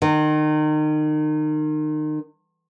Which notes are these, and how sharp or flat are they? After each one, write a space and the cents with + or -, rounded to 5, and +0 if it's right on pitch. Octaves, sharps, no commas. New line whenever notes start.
D#3 -30